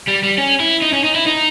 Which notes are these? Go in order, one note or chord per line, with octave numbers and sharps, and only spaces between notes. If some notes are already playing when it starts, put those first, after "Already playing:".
G3
G3
C#4
E4
D#4
C#4
D#4
E4
D#4